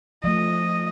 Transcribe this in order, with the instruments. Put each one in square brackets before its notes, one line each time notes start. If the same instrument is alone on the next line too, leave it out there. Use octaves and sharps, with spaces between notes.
[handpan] F3 A3 [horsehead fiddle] D#5